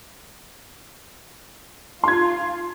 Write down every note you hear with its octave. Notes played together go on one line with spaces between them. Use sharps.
F4 C6 G#6